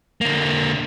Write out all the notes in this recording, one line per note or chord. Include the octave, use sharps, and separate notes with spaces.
D3 A#3